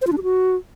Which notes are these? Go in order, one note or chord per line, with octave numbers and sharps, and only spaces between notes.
C5
F4
D4
G4
F#4